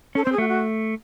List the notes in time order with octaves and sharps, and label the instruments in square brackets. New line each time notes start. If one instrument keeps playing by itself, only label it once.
[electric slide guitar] C#4 [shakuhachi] A4
[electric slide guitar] C4 [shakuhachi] C5
[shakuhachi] G#4
[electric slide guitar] A3 [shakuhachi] F#4
[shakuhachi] F#4